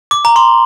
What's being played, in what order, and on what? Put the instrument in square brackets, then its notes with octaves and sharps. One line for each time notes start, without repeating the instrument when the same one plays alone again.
[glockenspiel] D6
A#5
C6